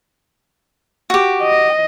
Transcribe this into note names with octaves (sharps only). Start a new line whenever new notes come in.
F#4 G4
D#5